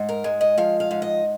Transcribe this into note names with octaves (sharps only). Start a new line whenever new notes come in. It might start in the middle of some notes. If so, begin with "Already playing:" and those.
Already playing: G#2
A#4
G#3
D#5
F3 F5
F5
G#2
D#5